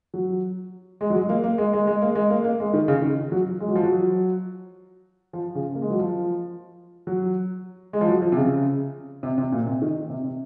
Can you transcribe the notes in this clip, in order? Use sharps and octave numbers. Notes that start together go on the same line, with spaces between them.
F#3
G#3
F#3
G#3
A#3
A#3
G#3
G#3
G#3
A#3
G#3
A#3
A#3
G#3
D#3
C#3
D#3
F#3
G#3
F#3
F3
F#3
F3
C#3
A#3
G#3
F#3
F3
F#3
G#3
F3
F#3
F3
C3
C#3
C3
C3
A#2
C3
D#3
C3
C3